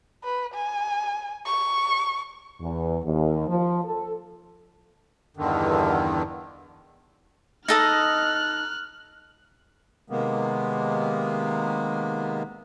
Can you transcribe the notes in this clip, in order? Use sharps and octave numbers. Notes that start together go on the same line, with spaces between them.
B4
G#5
C#6
E2
D#2
F3
A4
E2 G2 D3 D#3
D#4 A4 D#5 F6 F#6
C3 D#3 G#3 A#3 B3